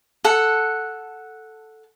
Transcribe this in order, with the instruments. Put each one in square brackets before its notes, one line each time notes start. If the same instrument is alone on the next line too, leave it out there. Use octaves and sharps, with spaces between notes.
[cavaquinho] A4 F#5